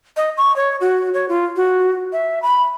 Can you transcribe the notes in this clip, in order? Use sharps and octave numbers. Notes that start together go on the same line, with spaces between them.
D#5
C#6
C#5
F#4
C#5
F4
F#4
E5
B5